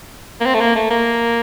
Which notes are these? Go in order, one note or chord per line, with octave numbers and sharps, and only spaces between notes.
A#3
C4
A3
A#3
A3
A#3